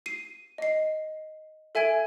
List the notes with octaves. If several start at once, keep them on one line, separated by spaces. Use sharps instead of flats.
C7 D#7
D#5 C7
A4 E5 G#5 G#6 D7